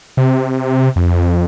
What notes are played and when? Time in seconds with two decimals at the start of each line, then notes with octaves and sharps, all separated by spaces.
0.17 C3
0.96 F2